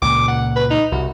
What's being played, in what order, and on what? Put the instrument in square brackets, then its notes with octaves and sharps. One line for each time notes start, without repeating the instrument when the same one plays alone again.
[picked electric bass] C#2 A#2 [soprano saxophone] D6
[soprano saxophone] F#5
B4
D#4
[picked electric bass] C2 [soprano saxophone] F#4